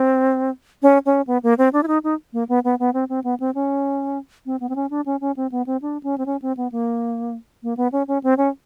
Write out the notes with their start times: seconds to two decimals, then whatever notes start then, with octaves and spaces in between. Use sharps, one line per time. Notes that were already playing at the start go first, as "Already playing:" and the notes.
Already playing: C4
0.82 C#4
1.06 C#4
1.27 B3
1.43 A#3
1.58 C4
1.73 D4
1.83 E4
1.88 D#4
2.04 D#4
2.33 A#3
2.49 B3
2.64 B3
2.80 B3
2.94 C4
3.09 C4
3.24 B3
3.40 C4
3.55 C#4
4.46 C4
4.60 B3
4.69 C4
4.76 C#4
4.91 D4
5.06 C#4
5.21 C#4
5.37 C4
5.52 B3
5.66 C4
5.82 D4
6.03 C#4
6.18 C4
6.26 C#4
6.42 C4
6.57 B3
6.72 A#3
7.63 A#3
7.77 B3
7.92 C#4
8.08 C#4
8.23 C4
8.38 C#4